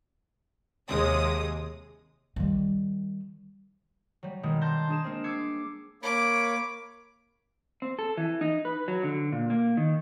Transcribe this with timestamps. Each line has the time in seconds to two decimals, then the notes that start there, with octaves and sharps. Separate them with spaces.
0.89 D#2 C3 G#3 D#6
2.36 D#3 G3
4.23 F#3 G3
4.43 B2 D#3 G3 G#3
4.61 A5 C6 G6 A#6
4.89 D4 G#4 E7
5.04 G#3 A#3 C4
5.24 D6 E6 G#6 C7 C#7
6.03 A#3 C#5 B5 D6
7.82 C4
7.99 A4
8.17 E3
8.41 D#4
8.65 B4
8.88 F#3
9.03 D3
9.32 A#2
9.50 A#3
9.77 D#3